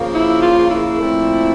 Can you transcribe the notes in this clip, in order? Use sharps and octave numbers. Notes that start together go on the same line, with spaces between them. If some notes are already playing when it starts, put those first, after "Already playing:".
Already playing: C#3 F3 A#3
E4
F4
E4
A#2 F3 A3 C4